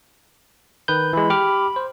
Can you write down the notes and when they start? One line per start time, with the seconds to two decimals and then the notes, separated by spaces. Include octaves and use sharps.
0.88 D#3 B4 G6
1.13 E3 G#3 B5
1.30 G4 D6 F6
1.76 C5